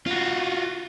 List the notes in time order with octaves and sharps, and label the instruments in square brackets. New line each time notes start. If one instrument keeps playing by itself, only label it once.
[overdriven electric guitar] F4 F#4